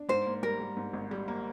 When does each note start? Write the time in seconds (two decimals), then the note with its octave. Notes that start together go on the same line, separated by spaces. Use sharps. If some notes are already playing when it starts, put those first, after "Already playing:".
Already playing: D4
0.09 G#2 C5
0.26 A#3
0.43 G3 A#4
0.60 G3
0.77 G#2
0.93 G#1
1.11 G3
1.28 A#3